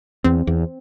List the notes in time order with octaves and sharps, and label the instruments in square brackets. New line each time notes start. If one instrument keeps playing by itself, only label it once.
[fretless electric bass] E2 [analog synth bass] C4
[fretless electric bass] E2